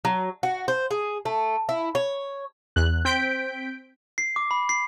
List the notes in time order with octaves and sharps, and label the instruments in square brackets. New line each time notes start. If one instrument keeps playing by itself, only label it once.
[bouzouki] F#3
F#4
C5
G#4
A3
E4
C#5
[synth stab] E2 F#6
C4 G6 B6 D7
[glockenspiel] C7
D6
B5
C7